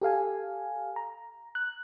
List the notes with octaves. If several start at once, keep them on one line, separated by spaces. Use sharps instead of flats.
G4 A4 F5 G#5
A#5
F#6